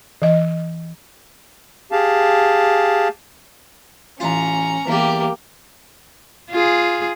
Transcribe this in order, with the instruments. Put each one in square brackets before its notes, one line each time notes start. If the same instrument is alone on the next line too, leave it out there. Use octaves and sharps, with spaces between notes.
[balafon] E3 D#5
[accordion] G4 G#4 F5 A5
[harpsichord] A1 F4 [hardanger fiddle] C#4 A#5
[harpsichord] E2 G3 [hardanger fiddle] A#3 G4
[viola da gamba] F4 G#4